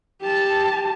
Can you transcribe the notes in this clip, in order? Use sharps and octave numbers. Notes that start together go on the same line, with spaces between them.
G4 A5